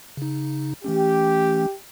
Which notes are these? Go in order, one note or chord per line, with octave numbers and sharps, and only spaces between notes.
C#3 D#4
E3 A3 C#4 G4